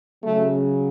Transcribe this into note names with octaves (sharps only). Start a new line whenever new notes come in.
C#3 F#3 A3